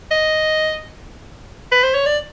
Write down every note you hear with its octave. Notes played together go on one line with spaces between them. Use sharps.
D#5
B4
C5
C#5
D5